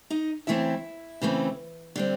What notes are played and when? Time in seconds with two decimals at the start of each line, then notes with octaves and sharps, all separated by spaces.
0.10 D#4 D#5
0.47 C#3 E3 A3 C4 E4 E5
1.22 C#3 E3 A3 C4
1.96 D3 G3 C4